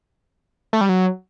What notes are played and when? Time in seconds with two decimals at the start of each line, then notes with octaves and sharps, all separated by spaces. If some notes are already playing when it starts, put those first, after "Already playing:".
0.73 A3
0.81 G3
0.89 F#3